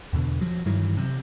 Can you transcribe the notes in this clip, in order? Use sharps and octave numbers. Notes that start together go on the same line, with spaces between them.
E2 B2 D3
F3 F#3
G2 D#3 E3 F#3
C3